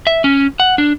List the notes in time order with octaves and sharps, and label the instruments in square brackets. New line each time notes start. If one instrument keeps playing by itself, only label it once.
[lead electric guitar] E5
C#4
F#5
D4